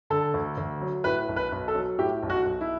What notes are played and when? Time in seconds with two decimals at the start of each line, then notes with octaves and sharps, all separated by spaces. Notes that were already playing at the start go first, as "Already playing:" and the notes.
0.10 D3 A4
0.34 D2
0.58 D2
0.81 F#3
1.04 A2 B4
1.28 B1
1.36 B4
1.52 B1
1.68 A4
1.75 F#3
1.98 A2 G4
2.23 B1
2.30 F#4
2.46 B1
2.61 E4